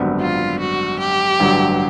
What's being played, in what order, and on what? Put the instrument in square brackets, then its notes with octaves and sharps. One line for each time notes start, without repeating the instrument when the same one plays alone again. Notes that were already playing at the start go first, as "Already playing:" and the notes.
Already playing: [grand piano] G#1 F#2 D3 G3 B3
[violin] F4
F#4
G4
[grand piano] A1 G2 D3 F#3